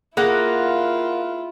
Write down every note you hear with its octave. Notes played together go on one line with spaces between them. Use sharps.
A#3 E4 F4 G#4 A#4 F#5